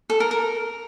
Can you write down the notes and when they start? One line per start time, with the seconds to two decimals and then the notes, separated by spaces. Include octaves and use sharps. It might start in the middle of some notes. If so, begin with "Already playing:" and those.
0.10 A4
0.20 A#4
0.31 A#4